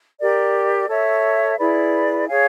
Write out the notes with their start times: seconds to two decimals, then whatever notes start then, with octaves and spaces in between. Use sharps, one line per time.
0.18 G4 A#4 D5
0.88 A4 C#5 E5
1.58 E4 G#4 B4 D5
2.27 G#4 C#5 F5 G#5